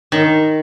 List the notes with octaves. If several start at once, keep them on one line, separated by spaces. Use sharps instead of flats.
D#3